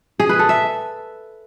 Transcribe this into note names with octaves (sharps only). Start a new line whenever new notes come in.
G#4
B4
A4
E5